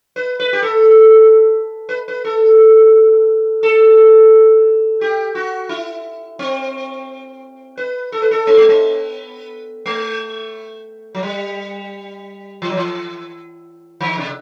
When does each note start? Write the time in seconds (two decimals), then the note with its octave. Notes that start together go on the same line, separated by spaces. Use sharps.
0.16 B4
0.40 B4
0.53 G4
0.62 A4
1.89 B4
2.08 B4
2.25 A4
3.63 A4
5.01 G4
5.35 F#4
5.69 E4
6.39 C4
7.77 B4
8.12 A4
8.22 B4
8.31 A4
8.47 B3
8.57 A3
8.69 B3
9.86 A3
11.15 F#3
11.23 G3
12.62 E3
12.70 F#3
12.77 E3
14.01 D#3
14.18 C3